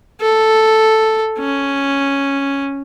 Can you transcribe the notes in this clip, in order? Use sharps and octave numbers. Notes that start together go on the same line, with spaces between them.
A4
C#4